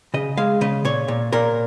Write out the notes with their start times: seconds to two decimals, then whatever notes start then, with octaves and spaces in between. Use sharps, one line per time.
0.14 C#3 D#5
0.37 G#3 F5
0.61 C#3 D#5
0.85 A#2 C#5
1.08 A#2
1.33 A#2 A#4